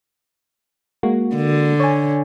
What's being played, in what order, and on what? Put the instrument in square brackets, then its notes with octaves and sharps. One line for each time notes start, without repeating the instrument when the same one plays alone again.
[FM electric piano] G#3 A#3 F#4
[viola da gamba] D3
[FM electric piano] C#5 G#5